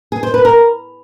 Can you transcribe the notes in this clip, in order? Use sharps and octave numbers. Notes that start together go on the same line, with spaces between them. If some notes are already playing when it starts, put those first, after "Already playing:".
G#4
C5
B4
A#4